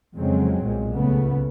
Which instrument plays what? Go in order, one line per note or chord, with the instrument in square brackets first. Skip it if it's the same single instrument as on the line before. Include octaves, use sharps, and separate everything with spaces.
[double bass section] F2 C#3 F#3 G#3 C4
B1 A#2 G#3
C#2 C#3 A3 B3